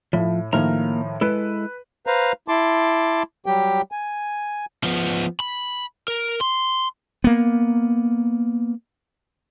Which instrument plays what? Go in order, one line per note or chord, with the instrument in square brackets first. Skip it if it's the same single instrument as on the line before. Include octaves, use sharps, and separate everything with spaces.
[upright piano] A2 E4 [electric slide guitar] F3
[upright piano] A2 D#3 F3 [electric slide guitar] A#3 A#4 A#5
[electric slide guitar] G#3 E4 A4 [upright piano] B4
[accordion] B4 C5 F5 A#5
E4 A5 C6 D6
F#3 G3 G4 G5
G#5
[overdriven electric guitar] F3 B3
B5
A#4
C6
[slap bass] A#3 B3